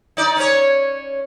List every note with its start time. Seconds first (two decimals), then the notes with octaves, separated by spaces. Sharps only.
0.17 D#4 D5
0.37 C#4 C#5